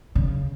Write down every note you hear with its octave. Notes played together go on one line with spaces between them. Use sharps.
C#3